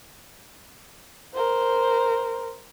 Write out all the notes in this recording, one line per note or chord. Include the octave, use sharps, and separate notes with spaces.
A#4 C5